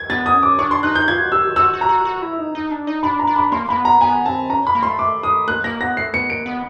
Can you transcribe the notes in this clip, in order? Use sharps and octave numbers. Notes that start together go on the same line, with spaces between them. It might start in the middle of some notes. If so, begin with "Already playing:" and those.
Already playing: G#6
B3 A6
D#6
C#4
D6
D4 C#6
C6
D#4 F#6
G6
F4 G#6
F#4
G4 E6
F#4
F#4 E6
F#4
A#5
F#4
F#4
E4
D#4
D#4
D4
D#4
D4 B5
A#5
D4
B5
A#3 C6
A#3 B5
B3
A#5
B3 G#5
C4 A5
C#4 A#5
B5
A#3
C6
A3
D6
D#6
A#3 F#6
A#3 A#6
B3 A#6
A3 C7
B3 C#7
A#3 D7
B3